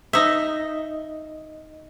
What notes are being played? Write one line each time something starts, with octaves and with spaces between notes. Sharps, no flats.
D#4 E5